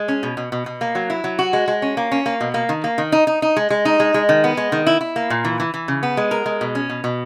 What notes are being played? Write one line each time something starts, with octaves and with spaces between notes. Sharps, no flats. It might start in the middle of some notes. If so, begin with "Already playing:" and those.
Already playing: G#3
C#4
B2
B2
B2
B2
A#3
F#3
E4
F#3
F#4
G#3
G#3
C#4
A#3
C#4
A#3
B2
A#3
D#3
A#3
D#3
D#4
D#4
D#4
G#3
G#3
D#4
G#3
G#3
D#3
B3
G#3
D#3
E4
E4
A#3
A#2
E3
E3
E3
C#3
B3
G#3
A#4
G#3
B2
C#4
B2
B2